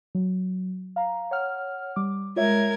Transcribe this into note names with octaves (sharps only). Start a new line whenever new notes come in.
F#3
F5 A#5
C#5 F#5 F6
G3 D6
G#3 F4 A#4 C#5 E5 G#6